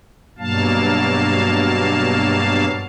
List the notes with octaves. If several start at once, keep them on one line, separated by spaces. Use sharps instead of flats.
G2 B2 F#3 A#3 F5 A5